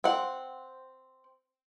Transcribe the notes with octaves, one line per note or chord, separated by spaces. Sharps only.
C4 F#5